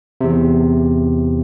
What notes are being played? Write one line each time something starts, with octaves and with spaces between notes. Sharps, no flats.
E2 C3